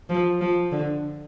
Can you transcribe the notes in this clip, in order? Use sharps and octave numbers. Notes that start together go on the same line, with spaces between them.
F3
F3
D3